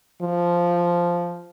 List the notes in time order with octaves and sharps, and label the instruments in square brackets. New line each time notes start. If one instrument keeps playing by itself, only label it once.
[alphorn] F3